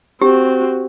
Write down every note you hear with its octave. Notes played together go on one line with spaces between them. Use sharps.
C4 F#4 G4